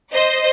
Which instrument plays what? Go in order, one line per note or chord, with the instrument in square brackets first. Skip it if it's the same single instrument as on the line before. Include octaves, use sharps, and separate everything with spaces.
[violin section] C5 D#5